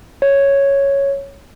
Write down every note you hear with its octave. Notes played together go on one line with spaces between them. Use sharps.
C#5